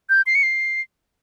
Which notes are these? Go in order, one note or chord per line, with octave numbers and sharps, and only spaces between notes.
G6
C7
C#7
C7